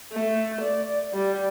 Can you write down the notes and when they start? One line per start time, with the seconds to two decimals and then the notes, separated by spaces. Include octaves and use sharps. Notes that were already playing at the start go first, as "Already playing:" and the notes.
0.12 A3
0.61 D5
1.14 G3